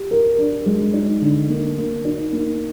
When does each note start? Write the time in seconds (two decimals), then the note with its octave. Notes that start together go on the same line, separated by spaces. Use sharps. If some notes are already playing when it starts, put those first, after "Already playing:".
Already playing: G4
0.11 A#4
0.38 D4
0.66 G#3
0.94 D#4
1.22 D3
1.50 A#3
1.78 A#3
2.05 D#4
2.33 A#3